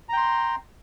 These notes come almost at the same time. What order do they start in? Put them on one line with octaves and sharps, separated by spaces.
A#5 G5 C6